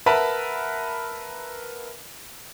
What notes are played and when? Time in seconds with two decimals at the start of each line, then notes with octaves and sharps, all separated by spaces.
0.06 A#4 B4 E5 F#5 A5 B5